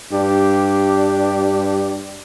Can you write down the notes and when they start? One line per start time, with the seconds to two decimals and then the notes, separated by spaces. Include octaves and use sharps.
0.11 G2 D4 G4